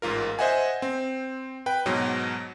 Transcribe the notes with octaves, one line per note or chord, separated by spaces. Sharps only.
A1 G#2 F4 A#4
C5 D#5 E5 F#5 G#5
C4
B4 G5
G#2 B2 F#3